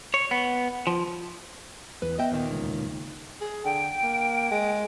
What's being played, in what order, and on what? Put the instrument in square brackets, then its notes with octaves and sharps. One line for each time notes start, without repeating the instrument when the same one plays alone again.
[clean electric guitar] C#5
B3
F3
[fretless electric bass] E2 [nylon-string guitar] B4
[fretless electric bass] B3 [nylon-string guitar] D#5 E5 G5
[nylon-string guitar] D#2 A#2 D#3
[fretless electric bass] E1 C#2
[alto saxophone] G#4
[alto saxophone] D3 [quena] G5
[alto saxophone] A#3
G#3